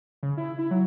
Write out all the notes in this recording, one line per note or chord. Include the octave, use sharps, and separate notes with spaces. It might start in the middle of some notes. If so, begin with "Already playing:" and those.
C#3
E4
E4
F#3